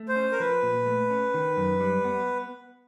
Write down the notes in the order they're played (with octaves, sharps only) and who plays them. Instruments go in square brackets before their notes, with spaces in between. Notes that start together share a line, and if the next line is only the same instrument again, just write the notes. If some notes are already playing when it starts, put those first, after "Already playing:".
Already playing: [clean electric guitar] A3
[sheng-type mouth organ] C5
[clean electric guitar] C#4
[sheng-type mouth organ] A#4
[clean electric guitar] F3 [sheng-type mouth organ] B4
[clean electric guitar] A#2
A3
C#4
D#3
F#2
G3
B3